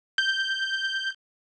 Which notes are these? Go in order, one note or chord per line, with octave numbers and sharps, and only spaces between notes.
G6